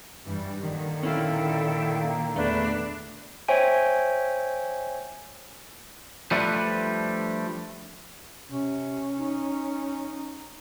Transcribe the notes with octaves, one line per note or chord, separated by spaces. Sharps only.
G2 E3 G3
A#2 D3 D#3
C#4 E4 A4 E5 F5 G5
A#3
E2 A3 D4 B4
C5 C#5 E5 G5 G#5
F3 G3 A3 D4 B4
C3 C#4
D#4